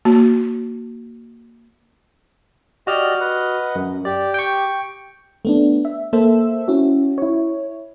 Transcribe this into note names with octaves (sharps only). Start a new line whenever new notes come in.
A#3 F#4
F#4 G4 D5 D#5 F6
B4 D#5 F#5
F#2
G4 D5
G5 C#6
A3 B3 D4
E5
A#3 A4 C5 E5 E6
C#4 E4 F#4
E4 C#5